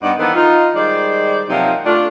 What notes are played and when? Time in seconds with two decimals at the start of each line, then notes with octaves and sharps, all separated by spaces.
0.02 G2 B3 D#4 D5 F#5
0.18 D#3 E3 A#3 B3 A4 C5
0.34 D#4 F4
0.74 D#3 G3 G#3 C5 D5
1.49 C3 F3 F#3 A#3 D#4
1.85 A3 D4 F4